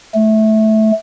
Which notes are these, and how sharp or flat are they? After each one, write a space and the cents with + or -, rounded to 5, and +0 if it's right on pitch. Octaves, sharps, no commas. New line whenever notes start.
A3 -15